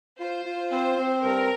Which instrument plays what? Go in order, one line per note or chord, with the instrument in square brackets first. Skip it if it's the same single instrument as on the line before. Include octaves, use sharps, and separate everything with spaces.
[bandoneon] F4 [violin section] C5
[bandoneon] F4
[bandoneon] C4 [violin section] C5
[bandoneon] C4
[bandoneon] G2 [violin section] A#4